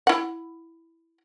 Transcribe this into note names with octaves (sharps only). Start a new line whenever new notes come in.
E4 F#5